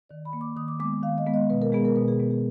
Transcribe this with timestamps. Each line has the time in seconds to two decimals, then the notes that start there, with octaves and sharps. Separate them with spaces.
0.09 D#3 D5
0.25 B5
0.33 A#3
0.41 D6
0.56 D#3 D#6
0.68 D6
0.80 G#3 B3 D6
1.03 D#3 F5
1.18 D#5
1.27 G#3 B3
1.34 D#5
1.50 B2 B4
1.62 A#4
1.72 G#3 B3 G#4
1.85 A#4
1.96 B2 B4
2.08 G#4
2.20 G#3 B3
2.31 G#4